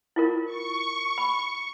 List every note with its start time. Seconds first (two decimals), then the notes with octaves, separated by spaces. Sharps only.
0.16 E4 F4 A#4
0.45 C#6
1.18 B5